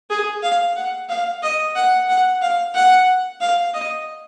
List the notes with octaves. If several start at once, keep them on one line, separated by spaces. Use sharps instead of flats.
G#4
F5
F#5
F5
D#5
F#5
F#5
F5
F#5
F5
D#5